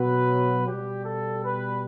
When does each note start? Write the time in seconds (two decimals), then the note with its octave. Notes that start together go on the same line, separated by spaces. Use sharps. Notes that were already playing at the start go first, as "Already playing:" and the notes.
Already playing: B2 F#3 B4
0.68 B2 G3 G4
1.05 A4
1.43 B4